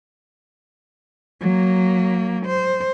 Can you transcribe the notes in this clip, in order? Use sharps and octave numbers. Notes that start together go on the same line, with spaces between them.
F#3 A#3
C5